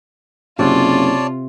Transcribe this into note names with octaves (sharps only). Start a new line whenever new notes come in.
F#1 C3 F4 C#5 D5 A5